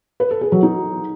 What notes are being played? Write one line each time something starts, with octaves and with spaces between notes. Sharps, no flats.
B4
A4
G#4
F#3
D#4